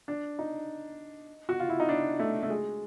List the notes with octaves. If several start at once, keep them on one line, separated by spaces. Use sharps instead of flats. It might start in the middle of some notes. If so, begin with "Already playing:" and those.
D4
D#4
F#4
F4
E4
D#4
D4
A3
A3
G#3